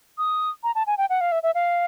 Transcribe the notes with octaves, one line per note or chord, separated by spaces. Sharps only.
D#6
A#5
A5
G#5
G5
F#5
F5
E5
E5
F5